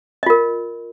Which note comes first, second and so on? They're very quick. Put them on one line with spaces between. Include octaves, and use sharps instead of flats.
D#5 F4 A#4